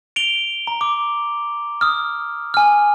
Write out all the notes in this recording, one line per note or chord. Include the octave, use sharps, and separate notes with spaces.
D7 F7 G7
A#5
D6
D#6 F6
G#5 F6